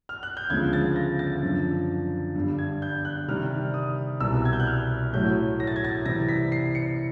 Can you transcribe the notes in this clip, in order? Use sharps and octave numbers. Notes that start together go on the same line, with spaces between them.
F6
F#6
G6
D2 C#3 F3 G#3 G#6
A6
A#6
A6
F#2 D3 F3
G2 D3 G3
G#6
G6
F#6
C3 D#3 G3 F6
D#6
C2 B2 G3 E6
G#6
G6
F#6
F6
A2 F#3 A3 G6
A#6
A6
G#6
A6
C3 E3 G3 C4 A#6
B6
C7
C#7